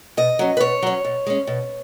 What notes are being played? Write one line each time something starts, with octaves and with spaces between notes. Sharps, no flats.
B2 D#5
F#3 C#4
B4
B2 C#5
F#3 C#4
B2
G#3 C#4
B2